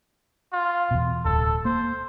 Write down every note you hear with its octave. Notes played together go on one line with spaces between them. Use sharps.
F4
E2 B2
D1 A4
A#3 C5